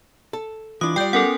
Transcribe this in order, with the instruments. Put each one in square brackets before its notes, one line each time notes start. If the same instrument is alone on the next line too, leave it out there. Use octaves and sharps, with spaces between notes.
[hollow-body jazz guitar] A4
[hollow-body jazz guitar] E3 D4 [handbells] F4 D6 [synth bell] D#6
[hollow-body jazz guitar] G3 D5 [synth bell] G5 G6
[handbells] B3 C#4 D6 [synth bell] A4 A#4 F#5